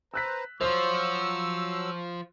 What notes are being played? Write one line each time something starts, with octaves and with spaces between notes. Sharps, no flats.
B4 C5 A#5 E6 F#6 B6
F3 F#3 F4 C5 C6 C#6 E6